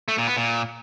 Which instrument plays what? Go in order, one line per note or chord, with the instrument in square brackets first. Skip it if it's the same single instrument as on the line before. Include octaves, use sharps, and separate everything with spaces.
[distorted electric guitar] A3
A#2
B3
A#2